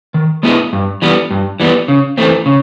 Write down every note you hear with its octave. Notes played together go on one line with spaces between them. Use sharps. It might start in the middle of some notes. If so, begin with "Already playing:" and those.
D#3
G#3 B3 E4 G#4
G2
E3 G3 B3
G2
E3 G3 B3
C#3
E3 A3 C4
C#3